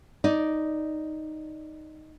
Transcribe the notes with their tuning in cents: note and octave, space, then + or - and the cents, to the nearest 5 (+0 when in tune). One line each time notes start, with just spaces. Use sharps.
D#4 +0 D5 +0